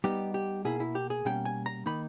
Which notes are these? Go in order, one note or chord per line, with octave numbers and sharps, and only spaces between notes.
G3 B3 D#4 G4
G4
B2 A#3 E4 G#4
E4
G4
G#4
B2 G3 A#3 C#4 G5
G#5
A#5
D#3 A#3 D#4 B5